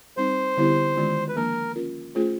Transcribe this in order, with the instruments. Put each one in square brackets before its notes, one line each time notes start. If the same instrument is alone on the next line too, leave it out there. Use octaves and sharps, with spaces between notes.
[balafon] G3 C4 D#4 [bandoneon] C5
[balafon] D3 G3 B3 E4 G4
D#3 G#3 C#4 F4
[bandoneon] B4
[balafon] F3 A#3 D4 [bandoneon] A#4
[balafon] C#4 F4 A#4
A3 C#4 F4 G#4 C5